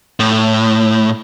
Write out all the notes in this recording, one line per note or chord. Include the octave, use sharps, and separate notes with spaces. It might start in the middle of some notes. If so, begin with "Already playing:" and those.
A2